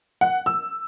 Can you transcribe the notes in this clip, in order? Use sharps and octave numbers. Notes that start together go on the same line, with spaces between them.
F#5
E6